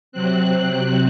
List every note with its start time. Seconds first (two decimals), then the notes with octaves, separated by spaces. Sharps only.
0.12 C3 F#3 C4 F#6